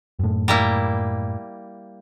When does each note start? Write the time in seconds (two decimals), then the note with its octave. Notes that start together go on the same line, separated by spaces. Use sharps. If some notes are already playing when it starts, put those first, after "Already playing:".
0.19 F#2 A2
0.48 G3 A#3 E4